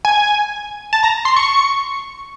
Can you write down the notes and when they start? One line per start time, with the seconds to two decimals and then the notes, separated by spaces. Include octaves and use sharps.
0.05 G#5
0.93 A5
1.03 A#5
1.25 C6
1.36 C#6